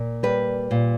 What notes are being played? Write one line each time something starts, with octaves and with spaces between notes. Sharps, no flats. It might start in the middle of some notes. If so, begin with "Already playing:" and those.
Already playing: A#2
G3 B4
A#2